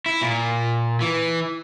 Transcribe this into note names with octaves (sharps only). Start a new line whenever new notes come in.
E4
A#2
E3